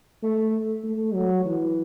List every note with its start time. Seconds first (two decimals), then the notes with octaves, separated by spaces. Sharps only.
0.23 A3
0.83 A3
1.14 F#3
1.45 E3